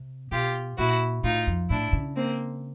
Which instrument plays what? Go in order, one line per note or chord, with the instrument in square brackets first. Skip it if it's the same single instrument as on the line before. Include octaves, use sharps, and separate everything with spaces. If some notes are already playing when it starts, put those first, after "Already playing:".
Already playing: [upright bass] C3
[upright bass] B2 [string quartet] F4 G4
[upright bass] A#2 [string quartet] E4 F#4
[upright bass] A2 [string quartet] D#4 F4
[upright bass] F2
[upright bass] A2 [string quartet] D4 E4
[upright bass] C#3
[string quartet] A#3 C4